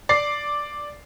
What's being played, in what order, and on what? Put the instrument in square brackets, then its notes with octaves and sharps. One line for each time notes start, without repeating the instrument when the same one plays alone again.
[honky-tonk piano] D5 D6 C7